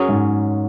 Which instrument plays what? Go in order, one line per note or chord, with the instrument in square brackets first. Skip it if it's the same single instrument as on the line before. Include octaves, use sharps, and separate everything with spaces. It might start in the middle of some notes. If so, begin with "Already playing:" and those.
Already playing: [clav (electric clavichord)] F#2 F#3 C#4 G#4
[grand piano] G#2